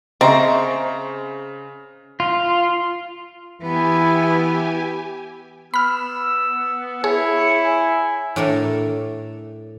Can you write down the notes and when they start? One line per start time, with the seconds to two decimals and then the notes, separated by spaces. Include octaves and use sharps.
0.21 C#3 C4 C5 D#5 E5 A#5 C#6
2.20 F4
3.62 E3 B3 E4 G4 G#5
5.74 B3 B5 E6 F6
7.04 E4 G#4 C#5
7.64 G#5
8.36 A2 D4 A4 A#4 E5